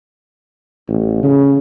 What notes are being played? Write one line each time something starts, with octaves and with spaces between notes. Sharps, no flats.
A1
C#3